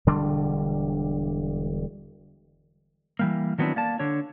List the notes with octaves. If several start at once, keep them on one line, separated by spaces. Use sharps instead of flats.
E1 D3 G3 D4
E3 G3 A#3
D#3 F#3 B3 C4 D4 E4
A#3 D5 A5
D3 D4 C#5